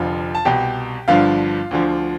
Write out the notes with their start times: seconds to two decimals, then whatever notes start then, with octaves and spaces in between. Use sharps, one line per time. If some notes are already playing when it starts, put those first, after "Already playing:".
Already playing: F1 F2 D3 F3 F4 F5
0.35 A5
0.45 C2 B2 G4 G5
1.08 G1 G2 D3 F3 F4 F5
1.71 D2 D3 F3